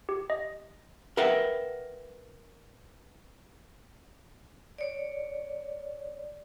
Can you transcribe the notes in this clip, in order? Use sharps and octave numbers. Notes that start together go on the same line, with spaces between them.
G4
D#5
A#4 B4 E5 F#5 G5
C#5 D5